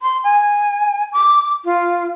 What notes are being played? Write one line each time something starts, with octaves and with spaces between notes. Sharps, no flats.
C6
G#5
D6
F4